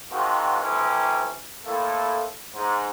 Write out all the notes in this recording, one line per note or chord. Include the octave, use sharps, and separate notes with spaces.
G#2 D#3 F3 C4 F#4
D2 C3 E3 C4 C#4
A2 A3 A#3 C4 E4 A4
G#2